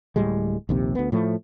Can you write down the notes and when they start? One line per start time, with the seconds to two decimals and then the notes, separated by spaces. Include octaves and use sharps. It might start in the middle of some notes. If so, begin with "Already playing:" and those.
0.16 D1 A2 G3 G#3
0.69 A#1 D#2 C3
0.95 D2 B3
1.12 A2 F3 A3